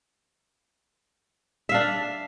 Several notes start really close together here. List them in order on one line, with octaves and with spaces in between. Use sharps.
E5 F5 D4